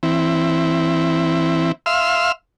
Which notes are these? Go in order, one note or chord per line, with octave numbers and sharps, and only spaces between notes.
E3 C4 E4
E5 F5 C6 E6 F6